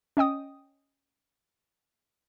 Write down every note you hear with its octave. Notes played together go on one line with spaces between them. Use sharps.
C#4 D#5 G5 D#6